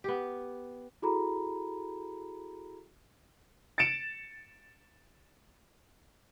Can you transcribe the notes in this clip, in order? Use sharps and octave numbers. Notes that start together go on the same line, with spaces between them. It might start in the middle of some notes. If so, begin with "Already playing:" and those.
B3 G4
E4 F#4 G#4 A4 A#5 B5
A6 C#7 D7 E7